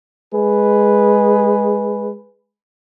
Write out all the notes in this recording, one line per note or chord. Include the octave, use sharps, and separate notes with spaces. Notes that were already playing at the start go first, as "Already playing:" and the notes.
G#3 G#4 B4